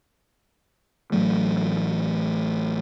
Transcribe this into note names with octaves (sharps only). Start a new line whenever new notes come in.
A1 D#3 F#3 A3